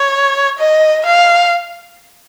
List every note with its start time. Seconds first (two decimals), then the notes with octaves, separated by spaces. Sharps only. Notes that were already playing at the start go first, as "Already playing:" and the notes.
Already playing: C#5
0.59 D#5
1.06 F5